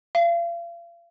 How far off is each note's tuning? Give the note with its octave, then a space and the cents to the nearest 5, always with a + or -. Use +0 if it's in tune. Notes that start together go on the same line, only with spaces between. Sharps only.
F5 -40